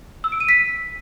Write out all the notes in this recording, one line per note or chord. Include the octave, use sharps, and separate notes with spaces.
E6
D7
D#7
B6